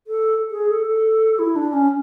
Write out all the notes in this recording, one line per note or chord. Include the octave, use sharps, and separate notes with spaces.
A4
G#4
A4
A4
E4
D4
C#4